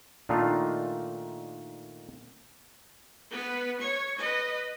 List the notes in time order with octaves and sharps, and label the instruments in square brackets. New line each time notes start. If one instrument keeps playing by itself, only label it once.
[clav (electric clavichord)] A#2 D#3 A3 D4 D#4 F4
[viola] B3 B4
C#5 C#6
B4 D#5